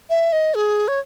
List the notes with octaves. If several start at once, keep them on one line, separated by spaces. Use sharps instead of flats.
E5
D#5
G#4
C#5